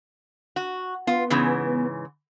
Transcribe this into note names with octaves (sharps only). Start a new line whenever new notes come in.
F#4
B3 F4
G#2 C#3 E3